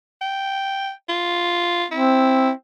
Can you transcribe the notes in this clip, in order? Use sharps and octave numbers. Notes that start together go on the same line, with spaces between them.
G5
F4
C4 E4